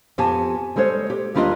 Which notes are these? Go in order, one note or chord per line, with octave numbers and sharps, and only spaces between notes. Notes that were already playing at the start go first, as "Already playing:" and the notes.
F2 B3 G4 G#5 A5
G3 G#3 A4 C5 C#5
G4
D#2 G3 D4 F4 A#4 D#5